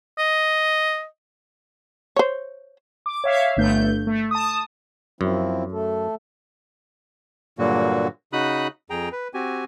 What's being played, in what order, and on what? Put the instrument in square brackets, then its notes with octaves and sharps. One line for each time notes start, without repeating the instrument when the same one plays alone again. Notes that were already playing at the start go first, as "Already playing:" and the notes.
[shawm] D#5
[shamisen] C5 C#5
[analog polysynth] D6
C#5 E5 F5
G1 G2 A3 G6
A3
A5 D#6
[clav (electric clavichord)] F#2 [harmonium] F3 C4 E4
[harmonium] A3 A4
[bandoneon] G2 A#2 D3 F#3 A#3 F#4
C#3 D#4 F#4 B5 D#6 F#6
F2 G#4 G5 A#5
B4
C4 F#4 G4 G#5